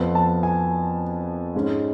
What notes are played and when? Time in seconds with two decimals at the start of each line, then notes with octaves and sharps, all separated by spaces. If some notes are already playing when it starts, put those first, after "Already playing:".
Already playing: F2 F3 B3
0.15 A5
0.43 G#5
1.55 G#2 G#3 C#4